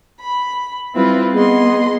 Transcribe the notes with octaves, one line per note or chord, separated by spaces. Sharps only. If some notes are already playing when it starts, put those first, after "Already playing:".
B5
G3 C4 E4 F4 B4
B3 G#4 D#5 C6